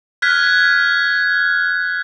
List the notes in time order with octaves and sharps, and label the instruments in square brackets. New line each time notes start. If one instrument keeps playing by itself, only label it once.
[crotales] F6 F#6 G#6 B6